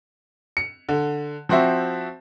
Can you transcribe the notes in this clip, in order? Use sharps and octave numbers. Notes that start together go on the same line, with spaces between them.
C#7
D3
F3 C4 F#4 C5 E5